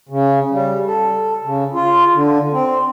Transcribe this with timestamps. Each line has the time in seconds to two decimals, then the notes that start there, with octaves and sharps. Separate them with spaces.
0.09 C#3
0.51 G3
0.87 A4
1.44 C#3
1.74 F4
2.14 D3
2.53 C4